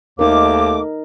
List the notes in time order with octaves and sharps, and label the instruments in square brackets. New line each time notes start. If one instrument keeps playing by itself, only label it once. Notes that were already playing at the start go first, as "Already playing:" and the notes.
[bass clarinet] D#2 [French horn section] B2 D#3 A3 [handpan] D#4 A#4 [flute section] D6